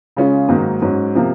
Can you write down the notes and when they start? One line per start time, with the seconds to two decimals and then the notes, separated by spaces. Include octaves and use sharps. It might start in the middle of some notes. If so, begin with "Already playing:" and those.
0.17 C#3 G#3 C#4 F4
0.48 G#2 D#3 F#3 A#3
0.82 G#2 F#3 C#4
1.15 C3 F3 A#3